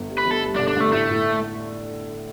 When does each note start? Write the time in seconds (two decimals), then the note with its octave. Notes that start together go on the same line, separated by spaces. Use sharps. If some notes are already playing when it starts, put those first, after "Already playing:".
Already playing: G1
0.09 G3
0.18 B4
0.26 G1 A4
0.43 G3
0.56 D4
0.59 D3
0.68 D4
0.76 D3 A3
0.92 A2 A3
1.10 A2